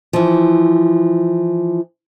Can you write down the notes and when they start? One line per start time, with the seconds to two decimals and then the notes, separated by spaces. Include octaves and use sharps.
0.13 E3 F3